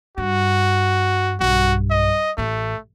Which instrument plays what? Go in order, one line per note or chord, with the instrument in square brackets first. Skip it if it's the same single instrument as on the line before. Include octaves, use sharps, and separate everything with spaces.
[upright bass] G2 [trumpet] F#4
[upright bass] B1 G2 [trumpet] F#4
[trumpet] D#5
[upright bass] A1 [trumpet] A3